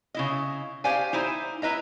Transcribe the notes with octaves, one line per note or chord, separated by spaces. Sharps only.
C#3 E4 D#5
G4 C5 D5 F5 G#5
D#4 E4 C5
E4 B4 D#5 A#5